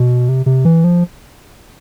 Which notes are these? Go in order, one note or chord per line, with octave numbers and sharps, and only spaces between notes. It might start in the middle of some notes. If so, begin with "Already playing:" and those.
Already playing: B2
C3
C3
E3
F3